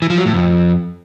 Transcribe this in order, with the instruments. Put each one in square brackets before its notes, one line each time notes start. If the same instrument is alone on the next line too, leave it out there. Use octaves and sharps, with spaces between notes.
[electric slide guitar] E3
F3
F#3
A2
F2